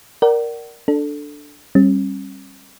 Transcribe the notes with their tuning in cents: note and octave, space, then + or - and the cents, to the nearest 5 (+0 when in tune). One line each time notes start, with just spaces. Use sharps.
A#4 +5 D5 +0 F#5 +40
D4 +0 A4 +0
G3 +0 C#4 -40